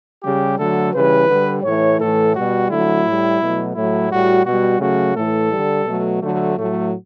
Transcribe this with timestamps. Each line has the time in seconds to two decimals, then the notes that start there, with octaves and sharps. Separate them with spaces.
0.22 C#3 G3 G4
0.58 D3 F#3 A3 A4
0.93 C#3 E3 G3 B4
1.28 D3 G3
1.63 A2 E3 A3 C#5
1.99 A2 E3 A3 A4
2.33 B2 G3 F#4
2.69 D3 F#3 A3 E4
3.05 A2 G3
3.40 B2 F#3 A3
3.75 A2 F#3 A3 E4
4.10 A2 G3 F#4
4.45 B2 G3 F#4
4.80 C#3 F#3 A3 F#4
5.15 A2 E3 A3 A4
5.51 D3 G3
5.85 B2 F#3 A3
6.21 D3 F#3 A3
6.56 A2 F#3 A3